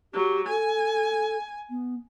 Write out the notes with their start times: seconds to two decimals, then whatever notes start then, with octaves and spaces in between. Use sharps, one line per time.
0.13 F#3 G4
0.49 A4 G#5
1.70 B3